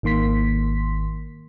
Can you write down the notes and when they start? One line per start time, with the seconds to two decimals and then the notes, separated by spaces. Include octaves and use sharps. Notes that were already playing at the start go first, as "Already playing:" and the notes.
0.03 G#1 D#3 A#3 C6 B6